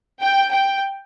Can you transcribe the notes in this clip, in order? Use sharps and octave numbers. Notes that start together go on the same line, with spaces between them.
G5
G5